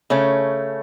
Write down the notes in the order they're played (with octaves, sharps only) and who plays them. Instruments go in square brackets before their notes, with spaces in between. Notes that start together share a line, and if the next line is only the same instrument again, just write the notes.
[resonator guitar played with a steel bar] C#3 A3 C#4